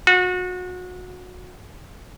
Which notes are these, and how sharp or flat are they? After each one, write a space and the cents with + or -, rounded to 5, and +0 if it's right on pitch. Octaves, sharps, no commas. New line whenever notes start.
F#4 -30